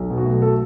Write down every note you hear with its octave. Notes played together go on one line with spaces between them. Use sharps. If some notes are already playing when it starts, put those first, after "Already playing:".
Already playing: B1
B2
F#4
A3
A4